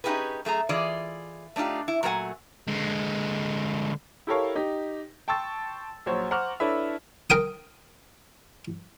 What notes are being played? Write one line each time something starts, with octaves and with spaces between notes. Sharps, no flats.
C#4 D#4 F4 G4 G#4 B4
F#2 A3 G#4 A#5
E3 F4 G#4 D5 D#5
A3 D4 D#4 F4 G4
E4
A#2 F#3 A3 A#4 F#5 G#5
D3 G#3
E4 G4 A4 A#4 C#5 F5
D#4 G4
G5 A5 C6 C#6 E6 A6
A#1 F#3 C5 C#5
C5 F#5 A#5 C#6 D6 F6
D4 E4 A4 B4 C#5 E5
A#4 G5 D#6